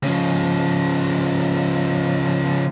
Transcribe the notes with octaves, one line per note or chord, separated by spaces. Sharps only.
C#3 F3